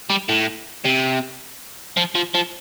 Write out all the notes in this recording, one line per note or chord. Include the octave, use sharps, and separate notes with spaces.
G3
A2
C3
F3
F3
F3